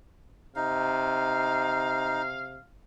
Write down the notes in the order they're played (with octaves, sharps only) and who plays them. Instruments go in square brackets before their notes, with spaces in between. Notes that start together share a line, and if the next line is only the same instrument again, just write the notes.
[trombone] C3 [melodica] D#4 [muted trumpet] F5